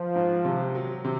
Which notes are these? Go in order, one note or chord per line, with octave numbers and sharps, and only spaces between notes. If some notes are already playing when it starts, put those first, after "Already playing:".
Already playing: F3
G#2
C3
F#3
C3